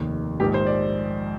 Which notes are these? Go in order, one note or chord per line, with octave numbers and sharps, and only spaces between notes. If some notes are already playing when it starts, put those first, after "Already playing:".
Already playing: F1 D#2 D#3
A#1 G#2 D#3 G4
C5
D5